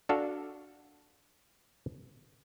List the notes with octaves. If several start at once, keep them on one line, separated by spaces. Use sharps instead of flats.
D4 F#4 A4 F5